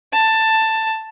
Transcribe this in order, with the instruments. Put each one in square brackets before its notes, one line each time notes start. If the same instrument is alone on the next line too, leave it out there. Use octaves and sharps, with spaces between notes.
[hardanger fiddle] A5